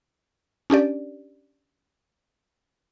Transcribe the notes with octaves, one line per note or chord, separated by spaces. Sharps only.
C#4 D4 G4 D5